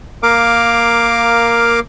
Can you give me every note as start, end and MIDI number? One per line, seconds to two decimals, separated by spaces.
0.23 1.80 58
0.23 1.80 70
0.23 1.80 77
0.23 1.80 86